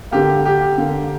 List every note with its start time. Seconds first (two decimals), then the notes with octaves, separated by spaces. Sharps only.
0.11 D3 A#3 G4
0.45 G4
0.78 D3 A#3